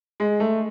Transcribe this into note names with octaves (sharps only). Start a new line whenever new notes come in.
G#3
A3